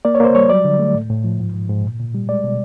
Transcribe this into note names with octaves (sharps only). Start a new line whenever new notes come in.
A#3 D5
C#5
A#3 C5
G3 C#5
F#3 D5
D3
A3
A2
A2
F3
G#2
G#2
G#2
A#2
A#2
G3
G#3 D5
B2